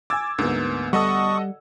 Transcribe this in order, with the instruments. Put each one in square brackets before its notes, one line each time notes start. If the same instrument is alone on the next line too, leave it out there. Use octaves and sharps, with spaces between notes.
[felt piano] G#5 A6 [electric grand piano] D6 E6 G#6
[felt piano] D2 B3 [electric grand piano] G#2 A#3
[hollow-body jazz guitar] G3 [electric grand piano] A4 D#5 F#5 [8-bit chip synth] C#6 D#6